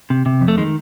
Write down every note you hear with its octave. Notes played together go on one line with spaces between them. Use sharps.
C3
C3
F2
A3
D#3 G#3